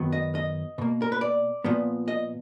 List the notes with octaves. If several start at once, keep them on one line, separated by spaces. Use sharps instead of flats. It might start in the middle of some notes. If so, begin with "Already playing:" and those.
Already playing: F#2 D#3 F#3 B3
D#5
D#5
B2 A#3
A#4
B4
D5
A#2 F3 B3
D#5